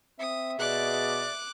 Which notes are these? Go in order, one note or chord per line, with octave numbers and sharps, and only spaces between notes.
C4 E5 D#6
B2 G#4 D5 D6 F#6